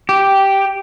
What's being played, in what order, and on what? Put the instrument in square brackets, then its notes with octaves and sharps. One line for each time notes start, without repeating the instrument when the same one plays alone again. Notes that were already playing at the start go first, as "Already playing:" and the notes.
[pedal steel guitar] G4